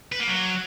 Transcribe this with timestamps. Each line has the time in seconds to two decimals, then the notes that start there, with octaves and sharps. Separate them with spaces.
0.12 B4
0.20 A#3
0.27 F#3